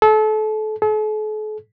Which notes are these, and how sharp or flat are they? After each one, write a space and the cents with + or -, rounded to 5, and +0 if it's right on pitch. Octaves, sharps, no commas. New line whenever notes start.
A4 -30
A4 -45